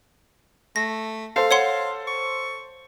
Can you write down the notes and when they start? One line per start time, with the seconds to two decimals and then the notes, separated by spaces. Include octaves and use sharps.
0.76 A3 A#6
1.36 A4 C5 F5
1.51 C#5 F#5 C6
2.07 C#6